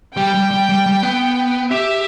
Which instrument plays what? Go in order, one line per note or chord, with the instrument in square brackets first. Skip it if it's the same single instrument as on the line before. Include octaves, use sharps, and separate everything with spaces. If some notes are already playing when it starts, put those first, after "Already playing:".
[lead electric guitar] G3 [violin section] G5
[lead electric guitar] G3
G3
G3
G3
B3
[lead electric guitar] G4 [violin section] E5